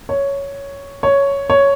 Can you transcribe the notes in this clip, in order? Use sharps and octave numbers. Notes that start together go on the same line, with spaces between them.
C#5
C#5
C#5